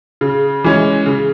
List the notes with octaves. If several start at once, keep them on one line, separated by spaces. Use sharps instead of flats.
C#3
E3 G#3 C#4
C#3